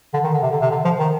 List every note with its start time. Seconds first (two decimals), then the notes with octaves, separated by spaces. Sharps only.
0.14 D3
0.23 D#3
0.33 D3
0.42 C3
0.51 D3
0.61 C3
0.70 D3
0.84 F3
0.99 D#3